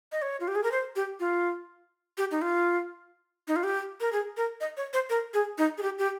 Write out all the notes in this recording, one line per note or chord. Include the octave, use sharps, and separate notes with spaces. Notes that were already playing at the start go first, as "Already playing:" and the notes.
D#5
C#5
F4
G4
G#4
A#4
C5
G4
F4
G4
D#4
F4
D#4
F4
G4
A#4
G#4
A#4
D#5
C#5
C5
A#4
G#4
D#4
G#4
G4
G4